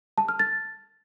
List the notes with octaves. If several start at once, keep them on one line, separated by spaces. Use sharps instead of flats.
A5
F6
A6